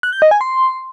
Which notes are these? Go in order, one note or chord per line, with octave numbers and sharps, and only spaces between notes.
F#6
G6
D#5
G#5
C6